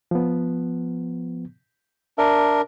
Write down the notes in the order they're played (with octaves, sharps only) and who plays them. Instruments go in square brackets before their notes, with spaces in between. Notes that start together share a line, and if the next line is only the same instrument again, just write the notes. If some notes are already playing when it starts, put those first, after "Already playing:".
[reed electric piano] F3 B3
[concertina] D4 A#4 [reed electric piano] E5